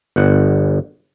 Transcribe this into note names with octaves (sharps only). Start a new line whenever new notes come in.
G1 F#5